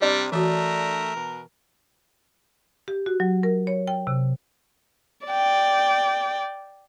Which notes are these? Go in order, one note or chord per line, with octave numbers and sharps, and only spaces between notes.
C3 G3 D4
E3 A3 F#4 A#4
B2
G4
F#4
F#3
A#4
C#5
G5
C3
D5 G5